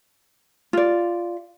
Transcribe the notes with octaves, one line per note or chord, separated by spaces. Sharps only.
F4 D5